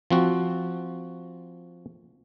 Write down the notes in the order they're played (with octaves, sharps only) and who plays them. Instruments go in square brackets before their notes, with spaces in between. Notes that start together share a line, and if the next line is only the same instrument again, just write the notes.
[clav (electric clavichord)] F3 C4 F#4